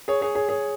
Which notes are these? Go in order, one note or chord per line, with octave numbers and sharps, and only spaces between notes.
G#4 C#5
G#4 C#5
G#4 C#5
G#4 C#5